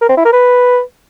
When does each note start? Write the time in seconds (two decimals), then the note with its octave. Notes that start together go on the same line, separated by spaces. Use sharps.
0.01 A#4
0.09 C4
0.17 E4
0.25 A#4
0.33 B4